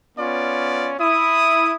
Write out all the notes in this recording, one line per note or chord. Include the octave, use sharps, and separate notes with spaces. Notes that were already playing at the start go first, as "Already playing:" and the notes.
B3 C#4 F4 D5
E4 D#6